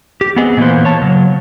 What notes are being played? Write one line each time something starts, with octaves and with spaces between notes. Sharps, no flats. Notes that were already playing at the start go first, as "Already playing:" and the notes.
G4
B3 C4 G#4 D#5
A#2 D#3 E3 A#3 B3 C5
C#5 A5
C#3 F#3